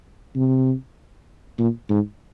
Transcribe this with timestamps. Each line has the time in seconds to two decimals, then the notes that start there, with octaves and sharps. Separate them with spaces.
0.36 C3
1.59 A#2
1.90 G#2